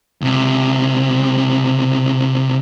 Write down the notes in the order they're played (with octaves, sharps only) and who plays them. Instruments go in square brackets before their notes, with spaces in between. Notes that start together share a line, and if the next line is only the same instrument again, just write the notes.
[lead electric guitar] C#2 C3